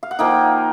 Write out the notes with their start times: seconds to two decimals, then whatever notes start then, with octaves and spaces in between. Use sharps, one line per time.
0.03 F5
0.11 F#5
0.19 F3 A#3 D#4 G5